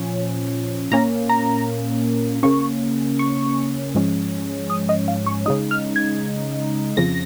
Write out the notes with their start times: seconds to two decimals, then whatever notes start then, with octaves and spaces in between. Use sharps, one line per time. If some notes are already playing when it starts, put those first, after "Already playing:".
Already playing: A#2 F3 C#4
0.91 A#2 A#3 C#4 A#5
1.29 A#5
2.43 C#3 A#3 C#4 C#6
3.19 C#6
3.95 G#2 F3 G#3 C#4
4.70 D#6
4.89 D#5
5.08 F5
5.26 C#6
5.46 C#3 G#3 D#4 D#6
5.71 F6
5.96 G#6
6.97 F2 C#3 F3 A#6